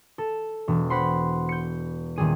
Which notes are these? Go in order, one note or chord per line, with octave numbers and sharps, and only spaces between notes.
A4
E1
C5 F#5 B5 C6
G6 C#7
D#1 G3 G#4 D#7